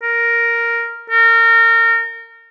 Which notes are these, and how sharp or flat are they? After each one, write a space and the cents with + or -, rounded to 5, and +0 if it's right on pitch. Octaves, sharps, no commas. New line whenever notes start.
A#4 +0
A#4 -30